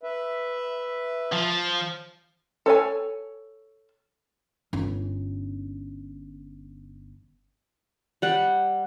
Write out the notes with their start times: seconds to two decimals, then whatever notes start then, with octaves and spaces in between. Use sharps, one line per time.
0.03 B4 E5
1.33 F3
2.66 A4 C#5 G#5
4.73 G1 C#4
8.22 G3 F#5